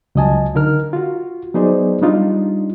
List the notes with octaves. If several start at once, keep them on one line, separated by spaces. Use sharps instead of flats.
C#2 F#3 D#5 G#5 A5
D3 D#4 A#4 F6
F4 F#4
F#3 B3 D#4 G#4 C5 D5
G3 D4 D#4 F4